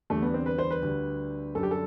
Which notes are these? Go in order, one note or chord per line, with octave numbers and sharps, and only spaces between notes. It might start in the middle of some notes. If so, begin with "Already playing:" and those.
E2 D3 G3 A3
B3
C4
B4
C5
B4
D2 D3 G3
F#2 D3 G3 A4
G4
A4